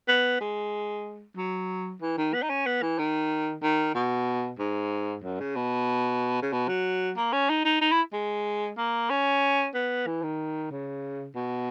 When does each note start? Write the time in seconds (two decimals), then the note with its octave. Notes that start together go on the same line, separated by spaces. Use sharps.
0.08 B3
0.41 G#3
1.37 F#3
2.01 E3
2.18 D#3
2.34 B3
2.42 D#4
2.50 C#4
2.66 B3
2.82 E3
2.98 D#3
3.62 D#3
3.95 B2
4.59 G#2
5.23 F#2
5.40 C#3
5.56 B2
6.42 C#3
6.52 B2
6.68 F#3
7.17 A#3
7.33 C#4
7.49 D#4
7.65 D#4
7.81 D#4
7.92 E4
8.13 G#3
8.78 A#3
9.10 C#4
9.75 B3
10.07 E3
10.23 D#3
10.71 C#3
11.35 B2